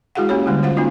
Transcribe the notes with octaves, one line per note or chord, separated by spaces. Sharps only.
G#3 E4 F#4 G#4 F5 F#5
A#3 C#4 G4 C#5
D3 G3 G#3 A#3 E4
F4 C5 F5 F#5
A#3 C#4 D#4 F4 F#4